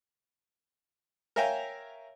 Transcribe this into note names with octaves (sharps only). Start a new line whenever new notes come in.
A#4 C#5 E5 F5 G5 G#5